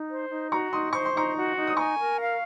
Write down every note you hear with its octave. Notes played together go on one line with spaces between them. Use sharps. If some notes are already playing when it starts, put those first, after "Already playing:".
Already playing: D#4
C5
D#4
F#4 A#5 C#6
D#4 C6 D#6
C5 C#6
C6
D#4 A#5 C#6
F#4
D#4
D#6
G#5 A#5 C#6
A#4
F5